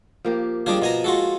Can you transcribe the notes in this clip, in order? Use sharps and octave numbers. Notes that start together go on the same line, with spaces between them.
F3 A#3 G4
F3 G3 D4 G#4 D#5
B2 G#5 A#5
G#3 F4 F#4 A4